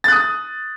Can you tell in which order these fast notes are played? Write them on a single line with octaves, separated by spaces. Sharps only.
A6 F#6 D#6